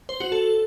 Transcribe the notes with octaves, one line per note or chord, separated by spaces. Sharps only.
C5
F#4
A4